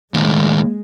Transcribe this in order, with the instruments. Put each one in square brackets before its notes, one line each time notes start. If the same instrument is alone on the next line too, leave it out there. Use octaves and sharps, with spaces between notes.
[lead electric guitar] D#2 A2 [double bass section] G#3